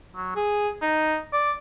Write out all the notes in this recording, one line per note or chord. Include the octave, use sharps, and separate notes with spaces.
F#3
G#4
D#4
D5